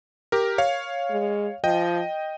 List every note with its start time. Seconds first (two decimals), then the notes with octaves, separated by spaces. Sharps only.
0.32 G4 A#4
0.58 C#5 F5
1.11 G#3
1.64 F3 D#5 G5